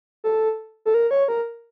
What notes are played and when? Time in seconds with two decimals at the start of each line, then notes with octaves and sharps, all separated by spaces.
0.24 A4
0.86 A4
0.94 A#4
1.11 C#5
1.28 A#4